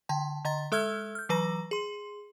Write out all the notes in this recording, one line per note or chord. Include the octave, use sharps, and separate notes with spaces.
D3 G5 A5
D3 D#5 A#5 A6
G#3 A4 E5 E6 F6 G#6
F6 G6
E3 F#3 B4 A#5 A#6
G#4 C6